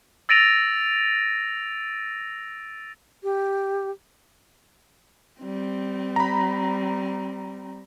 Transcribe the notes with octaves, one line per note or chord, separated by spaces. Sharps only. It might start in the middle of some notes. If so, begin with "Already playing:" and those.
E6 A6 A#6 D7 D#7 F7
G4
G3 C4
A#5 B5